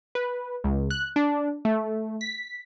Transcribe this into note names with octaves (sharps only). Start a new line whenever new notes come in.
B4
C#2
F#6
D4
A3
B6